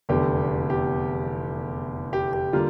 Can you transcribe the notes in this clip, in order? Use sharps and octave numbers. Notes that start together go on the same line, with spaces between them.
F1 E2 D3 G4
G4
G4
G4
D3 G3 A#3 F4